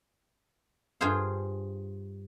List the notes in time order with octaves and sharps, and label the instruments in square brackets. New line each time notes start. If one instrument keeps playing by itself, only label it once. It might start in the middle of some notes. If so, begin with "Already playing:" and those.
[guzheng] G2 F4 G#4 C5 F5